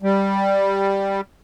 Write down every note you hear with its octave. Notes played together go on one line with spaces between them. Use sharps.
G3